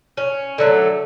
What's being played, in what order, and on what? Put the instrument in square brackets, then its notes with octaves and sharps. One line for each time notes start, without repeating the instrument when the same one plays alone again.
[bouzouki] C#4
D3 F#3 A3